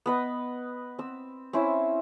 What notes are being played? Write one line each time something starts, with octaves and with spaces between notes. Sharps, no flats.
B3 B4 D#5
C4 E6
C4 C#4 E4 C5